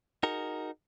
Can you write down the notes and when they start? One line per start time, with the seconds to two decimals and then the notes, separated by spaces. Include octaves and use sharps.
0.23 D#4 F#4 G#4 A#4